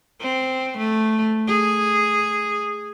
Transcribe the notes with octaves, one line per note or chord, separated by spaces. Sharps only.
C4
A3
G#4